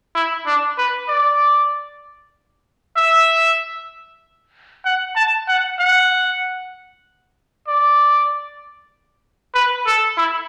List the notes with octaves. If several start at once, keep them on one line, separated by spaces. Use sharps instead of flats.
E4
D4
B4
D5
E5
F#5
A5
F#5
F#5
D5
B4
A4
E4